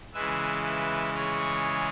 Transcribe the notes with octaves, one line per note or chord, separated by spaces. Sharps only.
C#3 E3 G#3 B4 E5
B4 E5
G#4 C#5